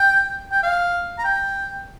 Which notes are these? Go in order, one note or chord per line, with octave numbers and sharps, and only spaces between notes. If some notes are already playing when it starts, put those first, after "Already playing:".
Already playing: G5
G5
F5
A#5
G5